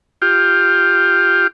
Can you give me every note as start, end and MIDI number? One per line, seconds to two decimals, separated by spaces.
0.22 1.47 65
0.22 1.47 67